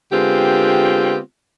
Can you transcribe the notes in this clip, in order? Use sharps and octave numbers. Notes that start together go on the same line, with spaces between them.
D3 G#3 B3 C4 F4 G4